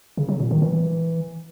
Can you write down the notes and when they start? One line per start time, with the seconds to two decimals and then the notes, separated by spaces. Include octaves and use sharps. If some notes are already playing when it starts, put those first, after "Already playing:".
0.17 C#3
0.29 F#3
0.40 A#2
0.51 D#3
0.62 E3